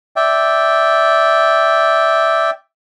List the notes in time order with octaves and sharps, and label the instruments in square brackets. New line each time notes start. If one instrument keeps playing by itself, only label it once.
[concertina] D5 E5 G5